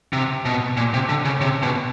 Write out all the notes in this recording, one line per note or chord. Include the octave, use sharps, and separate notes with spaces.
C3
B2
A#2
C3
D3
C#3
C3
B2